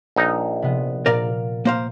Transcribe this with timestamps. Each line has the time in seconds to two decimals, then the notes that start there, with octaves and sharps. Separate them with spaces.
0.16 A#1 D#4
0.62 C3 F3 B3
1.06 A#2 A#4 D5 F5 A#6
1.65 A#3 C5 F5